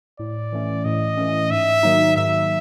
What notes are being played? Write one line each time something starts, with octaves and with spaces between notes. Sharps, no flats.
A2 D5
E3 A3 C#4
A2 D#5
E3 A3 C#4
G#2 E5
D#3 F#3 A#3 D#4
G#2 E5